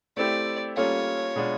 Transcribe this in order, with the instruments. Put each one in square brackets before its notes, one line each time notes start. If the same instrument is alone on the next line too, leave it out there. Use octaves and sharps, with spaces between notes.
[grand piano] A3 C4 E4 G4 [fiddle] D5
[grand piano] G3 A#3 C#4 F4 A4 [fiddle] C#5
[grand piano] B2 G#3 B3 D4 F4